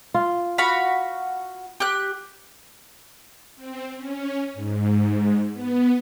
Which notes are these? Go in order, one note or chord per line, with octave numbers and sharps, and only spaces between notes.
F4
F#4 F5 B5
G4 F#6
C4
C#4
G#2
B3